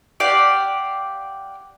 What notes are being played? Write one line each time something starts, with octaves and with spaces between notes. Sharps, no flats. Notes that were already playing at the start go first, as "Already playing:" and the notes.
G4 D5 F5 F#5